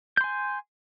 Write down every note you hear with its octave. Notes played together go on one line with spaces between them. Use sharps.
G#5 C6 G6